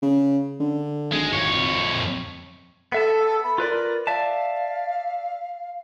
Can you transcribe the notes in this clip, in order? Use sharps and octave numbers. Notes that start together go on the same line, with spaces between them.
C#3
D3
G#1 G#3
F2 C#5
B3 A4 E5 A5
B5
F4 A#4 B4 D5
D5 E5 F5 A5